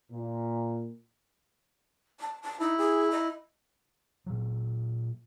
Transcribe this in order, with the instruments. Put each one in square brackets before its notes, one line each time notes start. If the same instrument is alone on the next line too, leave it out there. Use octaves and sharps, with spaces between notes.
[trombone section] A#2
[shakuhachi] A5
A5
[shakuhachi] D#4 [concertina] E4
[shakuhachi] G#4
D#5
[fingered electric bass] A#2 F#3